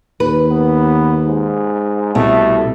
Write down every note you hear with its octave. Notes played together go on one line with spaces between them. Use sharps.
D#2 B4
B3
G#2
C2 B2 A3